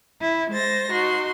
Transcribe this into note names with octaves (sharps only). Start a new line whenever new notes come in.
E4
G#3 C5 A6 A#6
D#4 F#4 C6